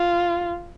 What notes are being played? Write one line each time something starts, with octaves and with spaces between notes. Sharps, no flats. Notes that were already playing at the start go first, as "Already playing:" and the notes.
Already playing: F4